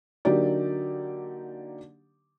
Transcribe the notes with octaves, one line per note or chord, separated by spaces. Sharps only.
D3 F#3 A#3 D#4 G4 D5